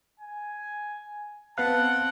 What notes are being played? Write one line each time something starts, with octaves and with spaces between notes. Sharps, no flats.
G#5
B3 C4 B4 F5 F#5 A5 F#6